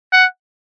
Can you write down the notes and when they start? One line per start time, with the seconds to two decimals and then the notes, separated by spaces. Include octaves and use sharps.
0.13 F#5